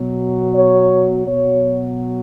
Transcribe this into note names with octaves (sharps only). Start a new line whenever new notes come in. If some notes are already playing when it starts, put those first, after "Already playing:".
Already playing: B2 F#3
C#5
B2 F#3 C#5